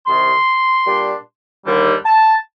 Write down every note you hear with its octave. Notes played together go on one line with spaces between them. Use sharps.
C2 C3 D#3 C6
A#2 G3 D4
D#2 D3 G3
A5